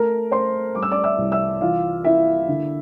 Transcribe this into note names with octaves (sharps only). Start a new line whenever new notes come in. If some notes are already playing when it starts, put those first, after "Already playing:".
Already playing: A3 A#4 A#5
A3 C5 C6
G3 D6
E6
D5 D6
E5 E6
C2
E5 E6
E3 F4 F5
A#3 E4 E5
D3